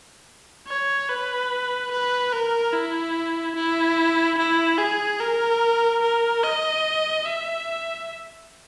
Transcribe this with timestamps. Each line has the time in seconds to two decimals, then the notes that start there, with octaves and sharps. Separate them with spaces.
0.68 C#5
1.09 B4
1.92 B4
2.33 A#4
2.74 E4
3.56 E4
4.38 E4
4.79 G#4
5.20 A#4
6.03 A#4
6.43 D#5
7.25 E5